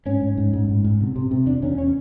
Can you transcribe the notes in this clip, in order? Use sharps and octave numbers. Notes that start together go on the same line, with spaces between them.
G#2 C#4
G#2
G#2
G#2
G#2
G#2
C3
C3
C3
E2 D4
E2 C#4
C#4